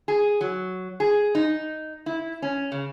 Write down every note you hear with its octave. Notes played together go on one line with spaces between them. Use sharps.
G#4
F#3
G#4
D#4
E4
C#4
C#3